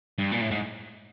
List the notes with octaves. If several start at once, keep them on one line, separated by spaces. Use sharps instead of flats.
G2
A#2
A2
G#2